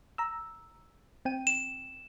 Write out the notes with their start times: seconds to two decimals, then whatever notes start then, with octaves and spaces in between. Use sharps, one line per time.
0.18 A#5 E6
1.25 C4 G5 D#7
1.47 E7